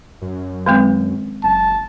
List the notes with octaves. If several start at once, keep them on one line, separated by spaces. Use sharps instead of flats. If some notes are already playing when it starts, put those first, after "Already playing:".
F#2
D#3 G#3 C4
F#1 A5